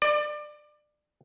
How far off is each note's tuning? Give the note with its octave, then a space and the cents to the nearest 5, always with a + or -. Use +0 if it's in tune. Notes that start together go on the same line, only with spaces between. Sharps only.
D5 +25